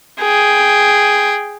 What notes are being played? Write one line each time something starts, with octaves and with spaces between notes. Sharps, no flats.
G#4 G5